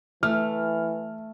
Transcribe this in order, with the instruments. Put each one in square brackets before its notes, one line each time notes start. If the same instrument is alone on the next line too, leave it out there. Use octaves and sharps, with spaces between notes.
[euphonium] E3 [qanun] A3 [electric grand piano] F6